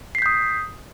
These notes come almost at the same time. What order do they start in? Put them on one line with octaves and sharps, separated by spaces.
C7 B6 G6 D#6